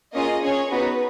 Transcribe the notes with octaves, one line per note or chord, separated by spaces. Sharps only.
A#3 C#4 F4 G#4 D#5
C#4 G#4 C#5
B3 D#4 F#4 B4